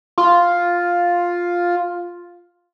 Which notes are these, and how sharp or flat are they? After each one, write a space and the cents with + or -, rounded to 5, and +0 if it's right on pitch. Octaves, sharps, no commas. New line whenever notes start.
F4 +5